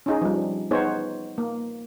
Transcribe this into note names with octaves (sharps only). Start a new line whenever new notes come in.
C#4 D#4 G#4
F3 G3
B3 D#4 G#4 C5 C#5
A#3